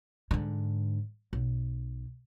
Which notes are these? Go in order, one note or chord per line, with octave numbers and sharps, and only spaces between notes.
G#2 D3
B1